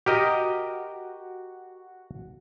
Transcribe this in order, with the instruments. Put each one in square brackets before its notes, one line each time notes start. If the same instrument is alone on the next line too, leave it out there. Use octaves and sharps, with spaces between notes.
[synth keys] F#4 [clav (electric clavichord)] G4 A#4 D#5